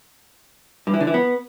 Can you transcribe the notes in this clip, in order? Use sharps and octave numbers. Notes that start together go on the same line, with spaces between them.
G2
E3
D3
E3
B3